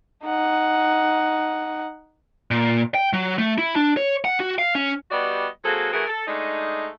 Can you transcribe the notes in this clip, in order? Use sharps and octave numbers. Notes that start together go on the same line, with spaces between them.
D#4 F#5
A#2
G5
F#3
A3
E4
D4
C#5
F#5
F#4
F5
C#4
G3 B3 F#4 G4 D5 D#5
F#3 A#3 C4 F#4 G#4 A4
E3 A3 E4 F#4 G#4 A#4
A4
G#3 A3 D4 D#4